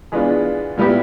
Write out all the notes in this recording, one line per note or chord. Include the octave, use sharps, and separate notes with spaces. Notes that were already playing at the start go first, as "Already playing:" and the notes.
E3 G#3 B3 D4 F4
A#2 G3 B3 E4 G4